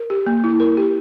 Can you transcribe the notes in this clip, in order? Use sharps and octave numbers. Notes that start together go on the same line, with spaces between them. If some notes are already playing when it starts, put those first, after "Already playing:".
Already playing: A#4
G4
A#3
E4
A#4
G4